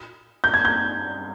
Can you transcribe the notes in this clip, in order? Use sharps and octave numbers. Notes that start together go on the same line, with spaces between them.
G6
G#6
G6